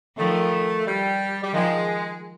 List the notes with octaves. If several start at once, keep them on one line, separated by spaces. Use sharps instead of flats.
D#3 F3 A3
G3
G3
D#3 F3 G#3